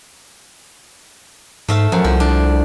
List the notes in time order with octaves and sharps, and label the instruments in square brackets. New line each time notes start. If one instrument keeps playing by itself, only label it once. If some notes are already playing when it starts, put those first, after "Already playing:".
[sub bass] G#2 [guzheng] A3 E5 F5
[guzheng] F#2 [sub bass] F3
[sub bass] C2 [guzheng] F3
[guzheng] D4